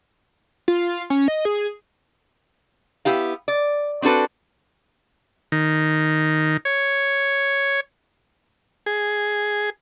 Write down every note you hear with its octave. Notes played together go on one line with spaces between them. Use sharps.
F4
C#4
D#5
G#4
B3 E4 G4 F5
D5
C4 D4 F#4 A4 B4
D#3
C#5
G#4